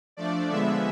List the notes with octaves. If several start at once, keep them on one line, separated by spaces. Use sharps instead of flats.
F3 A3 D4 D5
D3 F3 G#3 B3 E5